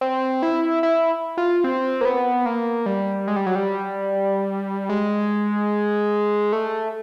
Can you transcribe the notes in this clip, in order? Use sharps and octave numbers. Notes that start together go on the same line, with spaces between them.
C4
E4
E4
F4
C4
A#3
B3
A#3
G3
G#3
G3
F#3
G3
G#3
A3